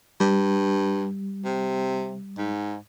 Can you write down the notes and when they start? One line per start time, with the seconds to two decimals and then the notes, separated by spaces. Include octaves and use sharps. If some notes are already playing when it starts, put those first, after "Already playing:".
0.20 G2 G3
1.45 C3
2.38 G#2